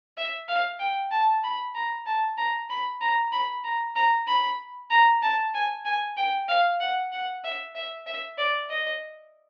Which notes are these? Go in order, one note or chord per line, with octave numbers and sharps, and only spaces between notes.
E5
F5
G5
A5
B5
A#5
A5
A#5
B5
A#5
B5
A#5
A#5
B5
A#5
A5
G#5
G#5
G5
F5
F#5
F#5
E5
E5
E5
D5
D#5